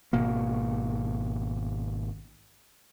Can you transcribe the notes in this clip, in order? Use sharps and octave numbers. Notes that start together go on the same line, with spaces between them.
G#1 B2 A#3